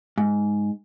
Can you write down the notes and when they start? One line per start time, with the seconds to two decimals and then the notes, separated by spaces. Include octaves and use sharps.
0.18 G#2